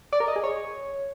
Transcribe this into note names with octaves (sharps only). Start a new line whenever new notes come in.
D5
A#4
D#5
G#4
C#5